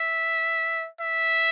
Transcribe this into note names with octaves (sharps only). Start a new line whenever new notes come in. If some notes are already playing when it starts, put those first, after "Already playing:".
Already playing: E5
E5